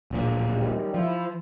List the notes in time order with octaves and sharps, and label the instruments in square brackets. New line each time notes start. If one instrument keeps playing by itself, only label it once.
[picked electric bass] D1 A#1 A#2
[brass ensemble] F#2 D#3 G3
[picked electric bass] F3 [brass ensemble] E4